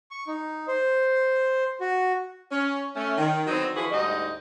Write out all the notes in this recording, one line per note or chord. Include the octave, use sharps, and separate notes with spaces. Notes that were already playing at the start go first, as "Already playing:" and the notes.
C#6
D#4
C5
F#4
C#4
A3 C#4
D#3
D3 F#3 B3 C4 D#4
D3 E3 F3 F#4 G#4 B4
D2 G#2 G3 D#4 D#5